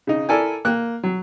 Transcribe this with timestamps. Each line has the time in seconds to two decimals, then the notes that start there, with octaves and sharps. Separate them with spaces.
0.07 C#3 D#4
0.29 E4 A4 A#4 D5 G#5
0.65 A#3 F#6
1.03 F#3